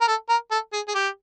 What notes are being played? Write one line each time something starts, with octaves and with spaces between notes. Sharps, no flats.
A#4
A4
A#4
A4
G#4
G#4
G4